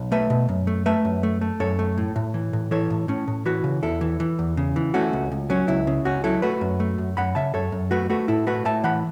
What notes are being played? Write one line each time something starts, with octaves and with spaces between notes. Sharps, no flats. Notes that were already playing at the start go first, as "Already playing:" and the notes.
Already playing: B1
A3 B4 E5
B2
F#2
A3
A3 B4 E5
F#2
A3
A3
F#2 A4 C#5
A3
A2
A2
E3
A2
E3 A4 C#5
A2
A2 C#4
A2
E3 F#4 B4
C#3
E2 E4 A4
E3
E3
E2
C#3
E3
A3 C#4 F#4
C#2
C#2
F#3 C#4
C#2 E4
C#3
C#2 C#4 F#4
F#3 E4 A4
A3 F#4 B4
F#2
A3
F#2
F#2 F#5 B5
C#3 E5 A5
F#2 A4 C#5
F#2
A3 F#4 B4
A3 F#4 B4
A2 E4 A4
A3 F#4 B4
A2 E5 A5
E3 F#5 B5